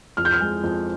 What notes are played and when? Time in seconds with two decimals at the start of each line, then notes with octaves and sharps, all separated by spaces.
0.17 F2 F6
0.25 G6
0.33 F6
0.40 G#3
0.64 F2